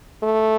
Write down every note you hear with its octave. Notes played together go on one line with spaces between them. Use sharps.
A3